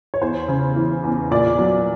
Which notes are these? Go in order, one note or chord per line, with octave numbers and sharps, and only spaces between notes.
C#5
E2 C5
C#3
E3
E2
A#2 D5
F#3